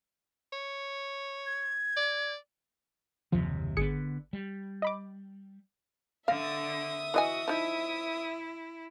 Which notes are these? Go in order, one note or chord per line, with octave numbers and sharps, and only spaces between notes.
C#5
G#6
D5
F#1 D#2 C3 F3
G#1 D3 B3 G#4 C#7
G3
D#5 B5 D6
D3 E5 F5 D#6
E3 F#4 D#5 G#5
F3 D#4 E4